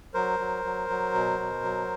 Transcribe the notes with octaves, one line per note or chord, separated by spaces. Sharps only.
F#3 A#4 C5
F#3
F#3
F#3
B2
B2
F#3